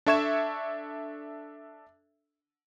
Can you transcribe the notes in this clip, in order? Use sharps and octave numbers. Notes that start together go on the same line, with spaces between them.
D4 A4 E5 C#6 G#6 E7